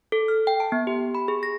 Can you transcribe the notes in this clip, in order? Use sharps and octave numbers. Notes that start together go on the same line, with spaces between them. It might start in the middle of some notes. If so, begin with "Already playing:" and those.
A4
F6
G5
A5
B3
G4
B5
G#4
A#6